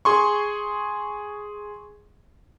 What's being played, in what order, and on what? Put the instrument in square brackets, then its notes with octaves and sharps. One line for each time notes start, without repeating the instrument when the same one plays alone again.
[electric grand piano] G#4 C6 C#6